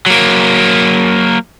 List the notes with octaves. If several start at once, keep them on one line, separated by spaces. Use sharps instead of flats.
F#3 A#3